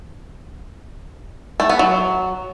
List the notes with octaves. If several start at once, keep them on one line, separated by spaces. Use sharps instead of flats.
A3
B3
F#3